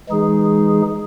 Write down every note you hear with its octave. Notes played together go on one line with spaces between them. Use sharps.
E3 G#3 D#4 G#4